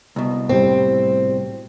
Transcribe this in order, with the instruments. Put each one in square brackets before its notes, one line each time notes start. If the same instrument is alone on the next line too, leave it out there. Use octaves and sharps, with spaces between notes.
[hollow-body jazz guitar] C2 B2
[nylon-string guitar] A2 G3 [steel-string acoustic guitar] C4